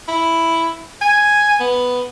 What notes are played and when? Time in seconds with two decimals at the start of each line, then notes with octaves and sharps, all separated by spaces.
0.08 E4
1.01 G#5
1.60 B3